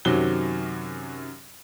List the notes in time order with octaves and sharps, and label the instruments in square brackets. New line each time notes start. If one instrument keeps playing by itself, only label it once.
[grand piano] F#2 C3 D#3 F#3 G7